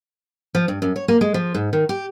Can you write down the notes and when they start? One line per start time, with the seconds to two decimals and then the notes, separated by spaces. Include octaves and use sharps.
0.55 F3
0.68 G2
0.82 F#2
0.96 C#5
1.08 A#3
1.21 G#3
1.34 F3
1.55 G#2
1.73 D#3
1.89 G4